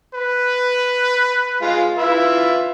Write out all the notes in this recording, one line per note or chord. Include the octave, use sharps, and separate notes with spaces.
B4
G#3 F4
E4 F4 B4 E5